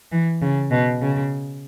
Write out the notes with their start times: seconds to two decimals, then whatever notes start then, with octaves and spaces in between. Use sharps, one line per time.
0.12 E3
0.42 C#3
0.71 B2
1.01 C#3